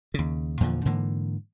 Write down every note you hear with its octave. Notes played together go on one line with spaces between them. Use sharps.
D#2 C#3
E2 A#2 D3 F3
G#2 D3 E3 A#3